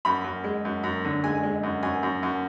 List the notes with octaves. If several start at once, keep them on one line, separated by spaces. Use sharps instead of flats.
F#2 B5
F#2
G#3
F#2
F#2
D3
G#3 G#5
G#3
F#2
F#2 G#5
F#2
F#2